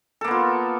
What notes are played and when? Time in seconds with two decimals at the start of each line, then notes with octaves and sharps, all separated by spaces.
0.21 A4
0.24 A#3
0.28 B3
0.31 F4